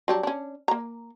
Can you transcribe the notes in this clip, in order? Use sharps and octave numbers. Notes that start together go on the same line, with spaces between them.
F#3 G3 D4
C#4 D4
A#3 A#5